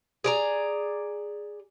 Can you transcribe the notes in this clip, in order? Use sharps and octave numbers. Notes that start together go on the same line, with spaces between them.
G#4 D5 A#5